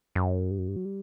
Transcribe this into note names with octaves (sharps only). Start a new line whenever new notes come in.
F#2
G2
F#2
G2
F#3
G3